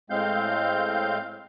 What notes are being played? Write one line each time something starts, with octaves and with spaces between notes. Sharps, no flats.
A2 G#3 C4 F5 G6